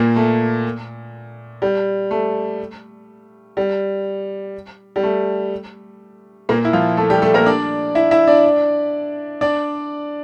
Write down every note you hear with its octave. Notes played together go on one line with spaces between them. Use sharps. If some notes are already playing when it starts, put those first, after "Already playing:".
Already playing: A#2 A#3
A3
G3
A3
G3
G3
A3
A#2 A#3
E4
F3 F4
A3 A4
G3 G4
A3 A4
A#3 A#4
D4 D5
E4 E5
E4 E5
D4 D5
D4 D5